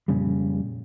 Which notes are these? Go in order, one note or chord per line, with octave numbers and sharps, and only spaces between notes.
F2 A#2 C#3 G3